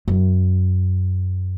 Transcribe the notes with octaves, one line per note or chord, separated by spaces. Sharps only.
F#2